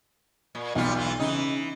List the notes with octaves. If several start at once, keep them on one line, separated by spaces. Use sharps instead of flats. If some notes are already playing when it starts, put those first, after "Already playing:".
A#2
B1 E2 G3 F4
E3 F4
C#3 E3 D#4